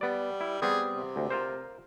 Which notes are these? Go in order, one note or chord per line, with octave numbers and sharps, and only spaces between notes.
G3 B3 D5
E4
G3 B3 C4 G#4
C3
D2
F4 A#4 C5